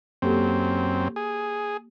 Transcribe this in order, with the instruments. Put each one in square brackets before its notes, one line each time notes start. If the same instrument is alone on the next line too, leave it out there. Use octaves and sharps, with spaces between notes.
[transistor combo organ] F#2 C4 [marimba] A#3 G4 A4
[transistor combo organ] G#4